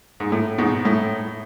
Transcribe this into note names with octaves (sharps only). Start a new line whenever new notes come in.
G#2
A2
G#2 B2
A2